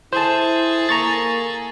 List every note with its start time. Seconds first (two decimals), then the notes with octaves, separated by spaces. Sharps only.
0.13 E4 G#4 A4 C5 A5
0.89 A#3 A#5 C#6 A6